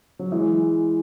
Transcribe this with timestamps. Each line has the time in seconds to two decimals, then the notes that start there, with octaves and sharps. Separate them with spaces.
0.19 F#3
0.32 E3 G#3